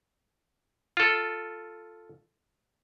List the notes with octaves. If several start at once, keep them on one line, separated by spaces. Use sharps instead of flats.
F4 A4